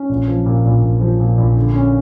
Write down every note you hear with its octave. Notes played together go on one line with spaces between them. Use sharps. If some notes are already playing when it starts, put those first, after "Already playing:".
Already playing: C#4
A#1
F3
A#2
A#1
A#1
F3
A#2
A#1
D3
C#4